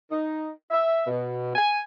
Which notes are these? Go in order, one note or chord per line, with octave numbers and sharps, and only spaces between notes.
D#4
E5
B2
G#5